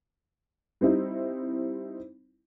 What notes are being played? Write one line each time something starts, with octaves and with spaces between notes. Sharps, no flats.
G3 C4 D#4 E4